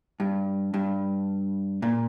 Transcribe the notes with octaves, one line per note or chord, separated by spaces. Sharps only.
G2
G2
A#2